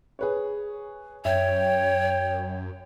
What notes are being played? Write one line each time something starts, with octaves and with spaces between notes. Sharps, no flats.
G#4 B4 C#5
F#2 C#5 E5 G5